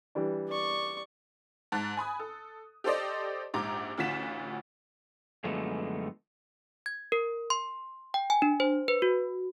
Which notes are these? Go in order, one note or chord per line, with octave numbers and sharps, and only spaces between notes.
E3 G3 D4
D5 C#6
G#2 A5 F#6 A6
G#5 B5 D#6
A4
G4 A4 C5 D5 D#5
A#1 G#2 G4 A#5 D6
A1 D2 F4 F#4 B6 E7
F#2 D3 F3 G#3 A3 B3
G#6
A#4
C6
G5
G#5
D4
C5
B4
F#4